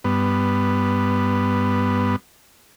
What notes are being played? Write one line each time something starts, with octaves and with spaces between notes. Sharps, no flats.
G2 B3